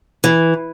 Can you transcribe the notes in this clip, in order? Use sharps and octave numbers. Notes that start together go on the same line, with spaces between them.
E3